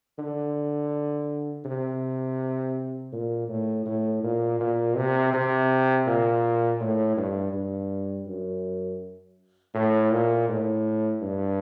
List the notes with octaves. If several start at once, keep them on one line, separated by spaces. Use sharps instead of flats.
D3
C3
A#2
A2
A2
A#2
A#2
C3
C3
A#2
A2
G2
G2
F#2
A2
A#2
A2
G2